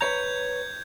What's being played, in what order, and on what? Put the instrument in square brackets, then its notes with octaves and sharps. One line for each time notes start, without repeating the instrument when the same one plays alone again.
[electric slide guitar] B4 C#5 A#5 [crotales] G6 G#6